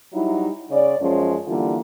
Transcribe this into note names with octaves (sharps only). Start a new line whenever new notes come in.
F#3 G3 D#4 E4
C#3 C#5 D5
F#2 F3 G#3 C#4
D3 E3 G3 A#3 F4